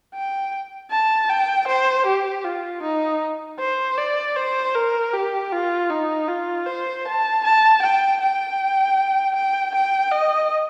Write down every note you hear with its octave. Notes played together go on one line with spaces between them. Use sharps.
G5
A5
G5
C5
G4
F4
D#4
C5
D5
C5
A#4
G4
F4
D#4
F4
C5
A5
A5
G5
G5
G5
G5
D#5